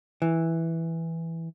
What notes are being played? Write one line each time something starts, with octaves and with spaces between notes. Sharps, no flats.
E3